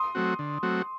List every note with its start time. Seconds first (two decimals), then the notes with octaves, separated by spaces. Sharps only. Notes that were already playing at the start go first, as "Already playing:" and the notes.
Already playing: C6 D#6
0.15 F#3 A3 C4 F#4
0.39 D3
0.63 F#3 A3 C4 F#4